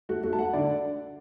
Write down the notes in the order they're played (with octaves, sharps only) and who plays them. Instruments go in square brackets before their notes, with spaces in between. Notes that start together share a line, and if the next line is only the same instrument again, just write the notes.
[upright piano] A3 F#4
A3 F#4
A5
A3 F#5
D3 D5